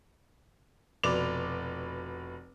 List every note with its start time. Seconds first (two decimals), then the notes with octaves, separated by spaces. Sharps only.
1.03 F1 B2 B4 D5 D6 F7